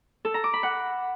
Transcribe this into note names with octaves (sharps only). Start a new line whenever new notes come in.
A4
A#5
D6
B5
F#5